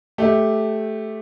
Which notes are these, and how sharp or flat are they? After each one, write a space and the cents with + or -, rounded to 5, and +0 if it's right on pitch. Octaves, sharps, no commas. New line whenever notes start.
A3 -10 G4 +0